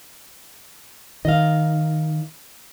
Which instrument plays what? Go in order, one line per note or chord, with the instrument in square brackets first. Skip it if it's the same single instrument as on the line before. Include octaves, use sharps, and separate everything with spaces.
[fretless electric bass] D#3 [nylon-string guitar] D#5 F5